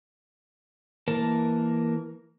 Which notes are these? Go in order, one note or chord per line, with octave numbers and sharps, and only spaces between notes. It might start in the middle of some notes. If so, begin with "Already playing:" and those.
E3 A#3 A#4 A5